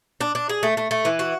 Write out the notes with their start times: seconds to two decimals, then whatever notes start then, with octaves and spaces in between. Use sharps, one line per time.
0.21 D4
0.35 D4
0.49 G#4
0.63 A3
0.77 A3
0.91 A3
1.05 E3
1.19 F#4